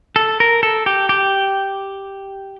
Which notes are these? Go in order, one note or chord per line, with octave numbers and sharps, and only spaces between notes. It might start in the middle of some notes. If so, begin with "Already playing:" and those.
A4
A#4
A4
G4
G4